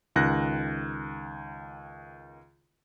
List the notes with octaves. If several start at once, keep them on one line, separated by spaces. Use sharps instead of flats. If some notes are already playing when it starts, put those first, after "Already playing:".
C#2 D#3 F#6 A#6